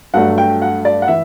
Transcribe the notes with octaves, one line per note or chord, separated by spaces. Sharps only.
G2 F#3 A3 D4 F#5
G5
F#5
D5
F#5
E3 E5